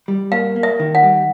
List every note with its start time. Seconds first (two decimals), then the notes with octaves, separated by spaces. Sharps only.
0.08 G3
0.32 A#3 F5
0.56 A#3
0.63 E5
0.80 D#3
0.95 F#5
1.03 G3